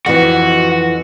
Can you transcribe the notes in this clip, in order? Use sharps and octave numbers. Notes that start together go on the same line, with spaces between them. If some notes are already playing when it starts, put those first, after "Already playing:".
F2 E3 F#4